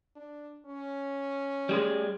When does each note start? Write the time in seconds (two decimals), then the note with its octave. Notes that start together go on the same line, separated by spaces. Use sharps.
0.15 D4
0.66 C#4
1.69 G3 G#4 C6